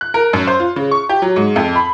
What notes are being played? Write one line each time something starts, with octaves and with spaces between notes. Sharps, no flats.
F#6
A#4
F#2
C5
F4
C#3
C#6
G4
F#3
G#2
F2
B5